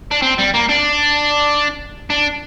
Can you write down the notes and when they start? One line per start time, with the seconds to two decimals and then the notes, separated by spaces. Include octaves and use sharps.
0.11 D4
0.22 C4
0.38 G3
0.54 A#3
0.69 D4
2.10 D4